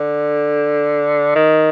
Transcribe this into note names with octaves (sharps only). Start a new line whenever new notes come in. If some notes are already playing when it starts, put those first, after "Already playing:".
Already playing: D3
D#3